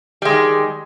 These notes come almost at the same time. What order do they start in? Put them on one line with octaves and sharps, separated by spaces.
G3 G#3 D#3